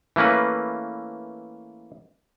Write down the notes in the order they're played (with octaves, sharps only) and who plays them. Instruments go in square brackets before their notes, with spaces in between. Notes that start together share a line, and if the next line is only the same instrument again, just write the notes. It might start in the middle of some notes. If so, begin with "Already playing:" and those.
[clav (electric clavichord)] E3 A3 A#3 C#4 B4